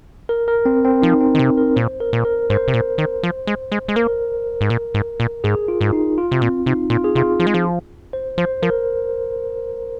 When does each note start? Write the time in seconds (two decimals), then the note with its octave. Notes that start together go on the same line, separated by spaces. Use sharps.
0.29 A#4
0.48 A#4
0.66 C4
0.85 C4
1.02 F3 D#4
1.20 C4
1.35 D#3
1.39 C3
1.58 A#4
1.76 A#2 C5
2.00 A#4
2.13 A#2
2.25 A#4
2.50 G#2 C5
2.68 C3
2.74 A#2
2.98 D#3
3.23 F3
3.47 G#3
3.72 G#3
3.88 G#3
3.96 A#3 A#4
4.61 G#2
4.70 A#2
4.94 G#2
5.20 A#2
5.44 G#2 G#4
5.68 F4
5.81 G#2
5.93 D#4
6.18 F4
6.31 C3
6.41 A#2 C4
6.66 C3 D#4
6.90 A#2 F4
7.04 G#4
7.15 C3 F4
7.40 F3
7.47 G#3
7.54 F3
8.13 C5
8.38 F3 C5
8.63 F3 A#4